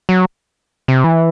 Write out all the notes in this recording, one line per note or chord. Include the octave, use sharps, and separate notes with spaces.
F#3
C3
E3